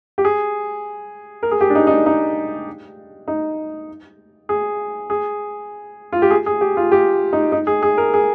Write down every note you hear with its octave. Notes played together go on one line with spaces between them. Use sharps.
G4
G#4
A#4
G#4
G4
D4
D#4
D#4
D4
D#4
D#4
G#4
G#4
F4
G4
G#4
G#4
G4
F4
G4
D#4
D#4
G#4
G#4
A#4
G#4